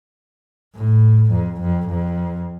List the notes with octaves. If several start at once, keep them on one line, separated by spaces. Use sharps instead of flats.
A2
F2
F2
F2